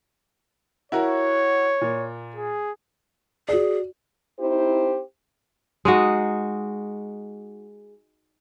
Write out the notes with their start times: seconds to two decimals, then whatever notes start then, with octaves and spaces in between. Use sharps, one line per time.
0.92 E4 F#4 A#4 C#5
1.81 A#2
2.36 G#4
3.48 F#4 G#4 D5
4.39 C4 D#4 E4 G4 C5
5.85 G#3 D#4 F#4